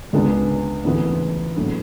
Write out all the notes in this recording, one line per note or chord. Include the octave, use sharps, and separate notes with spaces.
C#2 C#3 G#3 B3 D4
D2 C#3 E3 B3 E4
A2 F#3 B3 D4